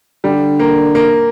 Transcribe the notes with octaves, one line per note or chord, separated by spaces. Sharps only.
D3 G3
A#3
A#3